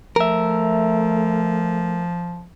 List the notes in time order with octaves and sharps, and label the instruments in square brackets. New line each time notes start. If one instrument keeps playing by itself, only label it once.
[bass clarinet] F3 [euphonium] A3 [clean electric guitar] A#4 E5